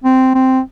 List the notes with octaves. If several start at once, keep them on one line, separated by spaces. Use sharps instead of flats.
C4
C4